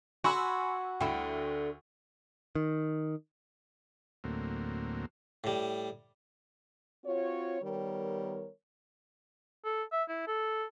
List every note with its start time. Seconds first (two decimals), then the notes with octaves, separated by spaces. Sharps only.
0.24 F#4 G#5 B5 C6 E6
1.01 D2 D3 E4 G5
2.55 D#3
4.24 D2 A2 F#3 A#3 C4
5.44 A2 G3
7.05 C4 F4 F#4 C#5
7.62 D#3 G3 B3 A#4 C#5
9.65 A4
9.92 E5
10.09 E4
10.27 A4